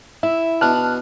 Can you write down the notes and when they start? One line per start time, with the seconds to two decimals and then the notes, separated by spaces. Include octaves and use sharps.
0.23 E4 E5
0.61 B2 D4 A5 F6 F#6